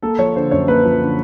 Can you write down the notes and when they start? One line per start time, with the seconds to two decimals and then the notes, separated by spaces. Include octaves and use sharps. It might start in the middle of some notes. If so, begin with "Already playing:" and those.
0.02 A#3 A4
0.19 F3 C#5
0.36 D3 C5
0.51 F#2 C#5
0.68 A#3 B4
0.85 F3
1.02 D3